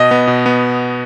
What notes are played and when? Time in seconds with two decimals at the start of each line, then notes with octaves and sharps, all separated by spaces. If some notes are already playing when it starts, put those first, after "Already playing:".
Already playing: B2 D#5
0.11 B3
0.27 B2
0.46 B3